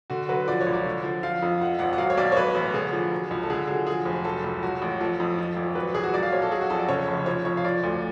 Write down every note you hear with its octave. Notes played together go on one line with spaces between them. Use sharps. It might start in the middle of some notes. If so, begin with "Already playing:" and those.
D3 F#4
F#3 B4
F3 D5
C#5
C#2
D5
D3
F3
F3 F5
F2
F3 F#5
G#1 F#5
F#5
F#3 F5
C#5
B1 D5
C#5
F#3 B4
A1
D3 G#4
F3
F#3
C#2
A4
D3 G#4
F#3 G#4
F3 G#4
F1
F#3 A4
C#2
F#3 F#4
A1
F3 A4
F2
F3
G#1
F#3 B4
C#2 G#4
F#4
F#3 D5
F5
B1 C#5
A4
F#3 G#4
F#4
F2 A4
D5
C#3 C#5
F1
F3 C#5
F2 C#5
F5
F3 D5
D2